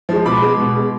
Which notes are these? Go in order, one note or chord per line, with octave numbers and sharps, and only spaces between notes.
F3 G#3
B2 B5 D6
G#3
B2
G#3